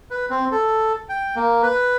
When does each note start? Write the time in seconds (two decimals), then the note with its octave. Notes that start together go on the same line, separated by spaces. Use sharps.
0.11 B4
0.30 C4
0.52 A4
1.09 G5
1.36 A#3
1.63 B4